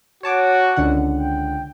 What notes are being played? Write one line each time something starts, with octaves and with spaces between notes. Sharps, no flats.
F#4 C#5 A5 D6
C#2 D3 F#5
G5